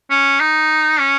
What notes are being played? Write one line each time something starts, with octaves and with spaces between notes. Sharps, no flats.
C#4
D#4
C#4